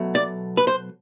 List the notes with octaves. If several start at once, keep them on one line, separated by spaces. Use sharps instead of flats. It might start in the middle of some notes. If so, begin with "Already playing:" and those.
Already playing: B2 F#3 A3
D5
B4
C5